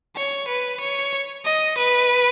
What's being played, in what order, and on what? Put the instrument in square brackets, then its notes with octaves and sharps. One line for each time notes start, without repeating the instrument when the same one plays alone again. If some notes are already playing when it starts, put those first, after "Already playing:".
[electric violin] C#5
B4
C#5
D#5
B4